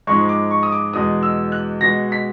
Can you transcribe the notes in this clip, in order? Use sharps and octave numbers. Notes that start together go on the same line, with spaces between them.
G#2 F3 G#3 C#6
D6
C#6
D#6
D6
E2 B2 G#3 D#6
E6
F#6
B2 G#3 A#6
B6